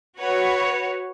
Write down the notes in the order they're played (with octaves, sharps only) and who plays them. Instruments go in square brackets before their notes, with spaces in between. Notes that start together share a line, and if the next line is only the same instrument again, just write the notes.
[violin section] F#4 B4 C#5